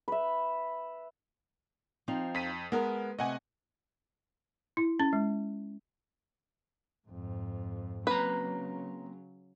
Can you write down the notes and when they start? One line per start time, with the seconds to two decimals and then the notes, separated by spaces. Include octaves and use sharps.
0.08 B4 E5
2.08 F3 C4 D#4
2.35 F2 B6 D#7
2.72 G#3 B3 A#4
3.19 C3 A3 D#5 F#5 G#5
4.77 E4
5.00 C#4
5.13 G#3
7.08 F2 G#2
8.07 C#3 F#3 A#3 C4 B4 A#5